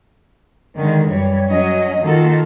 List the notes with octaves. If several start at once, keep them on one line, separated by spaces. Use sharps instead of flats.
D3 D#3 G#3
F#2 E3 G3 C#5
F#3 C#4 F#4 D#5
D#3 A#3 F4 F#4 A4